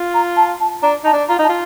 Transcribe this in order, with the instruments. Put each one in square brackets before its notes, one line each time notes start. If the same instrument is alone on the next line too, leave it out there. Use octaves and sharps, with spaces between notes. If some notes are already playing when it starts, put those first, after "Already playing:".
Already playing: [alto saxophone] F4
[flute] A#5
A5
A5
[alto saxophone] D4 [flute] A#5
[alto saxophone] D#4 [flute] A5
[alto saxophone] D4
[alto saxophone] F4 [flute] A#5
[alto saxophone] D#4 [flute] A5
[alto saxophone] F4